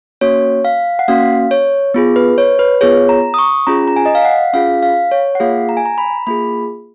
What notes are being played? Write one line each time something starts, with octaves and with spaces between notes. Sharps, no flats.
A#3 C#4 F#4 C#5
F5
F#5
A#3 C#4 F#4 F5
C#5
B3 F4 G#4
B4
C#5
B4
B3 F4 G#4 C#5
A#5
D#6
C#6
C#4 F4 G#4 A#5
A#5
G#5
D#5
F5
F#5
C#4 F4 G#4 F5
F5
C#5
F#5
A#3 F4 G#4 F5
A#5
G#5
A#5
B5
A#3 F4 G#4 B5